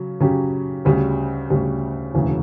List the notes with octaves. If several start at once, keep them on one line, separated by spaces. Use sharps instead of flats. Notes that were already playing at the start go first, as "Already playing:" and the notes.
Already playing: C#3 F#3 C#4
C#3 F#3 C#4 G4
D2 C#3 G3
D2 C#3 G3
E1 D2 C#3 E3